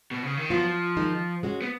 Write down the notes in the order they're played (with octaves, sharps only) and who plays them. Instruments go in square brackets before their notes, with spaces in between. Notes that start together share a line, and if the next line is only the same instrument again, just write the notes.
[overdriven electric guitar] B2
C#3
D#3
[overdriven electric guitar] F3 [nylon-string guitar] F#3 B3 F4
[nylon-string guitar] D#3 G#3 D#4
G#3 C#4 F#4
[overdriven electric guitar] B3